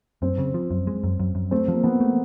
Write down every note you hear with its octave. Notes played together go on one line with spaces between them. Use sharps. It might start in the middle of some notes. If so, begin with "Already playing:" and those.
F#2 C4
C#3
F3
F#2
G#3
F#2
F#2
F#2
A3 C4
F3
A#3
F3 B3
A3